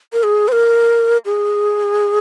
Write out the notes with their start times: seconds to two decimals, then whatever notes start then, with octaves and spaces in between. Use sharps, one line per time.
0.13 A#4
0.23 G#4
0.48 C5
0.52 A#4
1.25 G#4